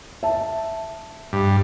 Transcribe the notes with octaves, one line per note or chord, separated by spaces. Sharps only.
E5 A5
G2